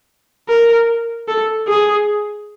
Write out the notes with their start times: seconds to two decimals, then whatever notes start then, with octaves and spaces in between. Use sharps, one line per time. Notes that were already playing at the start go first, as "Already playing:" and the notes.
0.49 A#4
1.28 A4
1.68 G#4